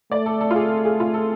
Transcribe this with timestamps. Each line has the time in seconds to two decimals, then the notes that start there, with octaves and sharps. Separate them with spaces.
0.12 A3 D5
0.26 A4
0.41 A4
0.51 F4
0.55 G#4
0.85 G#4
1.00 F4
1.14 A4